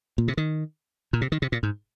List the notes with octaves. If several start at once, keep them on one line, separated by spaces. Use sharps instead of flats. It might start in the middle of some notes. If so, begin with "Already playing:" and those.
A#2
C3
D#3
A#2
C3
D#3
C3
A#2
G#2